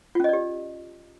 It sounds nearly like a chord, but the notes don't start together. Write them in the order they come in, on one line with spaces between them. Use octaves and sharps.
F4 C#4 D#5 D5 G4